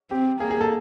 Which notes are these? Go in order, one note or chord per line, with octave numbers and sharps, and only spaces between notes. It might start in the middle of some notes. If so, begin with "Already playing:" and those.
C4 G4
A#3 G#4
G#4
A4